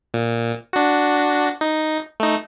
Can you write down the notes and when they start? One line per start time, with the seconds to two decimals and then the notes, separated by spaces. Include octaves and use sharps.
0.14 A#2
0.73 D4 F#4
1.61 D#4
2.20 A3 D#4